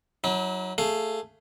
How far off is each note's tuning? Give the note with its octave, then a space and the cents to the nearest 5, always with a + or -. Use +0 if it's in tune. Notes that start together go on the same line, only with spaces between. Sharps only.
F#3 +0 E4 -45
A3 +10 G#4 +0 F5 +0